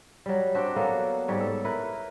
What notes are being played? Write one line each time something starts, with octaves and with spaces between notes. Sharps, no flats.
F#3 G3
C4 D4 F#4 G4
F#3 A#3 B3 A4
G#2 G3 C#5
A4
E4 A#4 B4